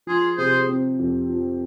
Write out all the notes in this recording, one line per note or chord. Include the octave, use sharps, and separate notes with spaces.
F3 F4 G#4
C3 G#4 C5
C4
F2
F3